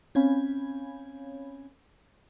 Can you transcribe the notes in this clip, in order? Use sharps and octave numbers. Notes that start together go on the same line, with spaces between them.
C4 C#4 C#5 F5 G#5 B5